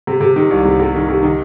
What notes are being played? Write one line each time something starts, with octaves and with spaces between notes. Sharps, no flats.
C3
C3
D#3
C2
C3
C3
D#3
C3
D#3